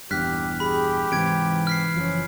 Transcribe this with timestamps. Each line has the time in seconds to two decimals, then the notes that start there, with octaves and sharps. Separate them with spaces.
0.11 D#1 E2 G2 G4 F6 F#6 B6
0.60 G4 G#4 B5
1.12 G#2 C3 E3 G#6 D7
1.67 F6 B6 C7
1.96 F#1 F3 C#4